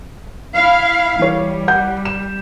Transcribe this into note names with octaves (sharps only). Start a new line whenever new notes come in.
E4 F5
E3 G3 C#5
F#5 G6
E7